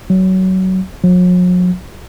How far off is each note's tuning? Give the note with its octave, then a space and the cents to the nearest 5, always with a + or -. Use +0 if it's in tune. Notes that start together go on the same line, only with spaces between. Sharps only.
F#3 +20
F#3 -45